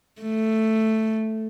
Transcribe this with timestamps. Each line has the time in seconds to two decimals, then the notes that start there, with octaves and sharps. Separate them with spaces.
0.22 A3